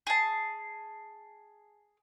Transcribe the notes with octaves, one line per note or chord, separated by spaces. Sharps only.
G#4 A5